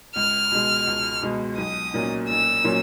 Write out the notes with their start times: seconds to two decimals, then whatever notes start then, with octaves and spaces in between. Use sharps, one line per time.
0.16 C#2 F6
0.51 B2 G#3
0.87 C#2
1.22 B2 G#3
1.58 B1 D#6
1.94 A#2 F#3 A#3 C#4
2.29 B1 E6
2.64 A#2 F#3 A#3 C#4